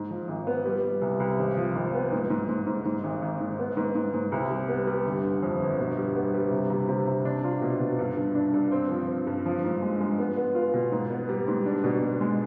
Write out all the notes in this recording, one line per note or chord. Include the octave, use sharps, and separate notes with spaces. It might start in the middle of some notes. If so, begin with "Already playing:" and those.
Already playing: G#2
F3
G#1
B3
G3
G3
C2
C2
G#1
F3
G#1
B3
G#2
G#2
G#2
G#2
G#2
G#1
G#1
G#2
B3
G#2
G#2
G#2
C2
G3
B3
G3
G1
D3
F2
G1
B2
G3
B3
G3
C3
C3
C3
C3
D4
F4
B2
B2
G2
G2
D4
G2
C4
F3
C4
G2
F3
G#2
G#3
G#3
B3
B3
F4
B2
G#2
B3
G3
G#2
D4
B2
B2
G#3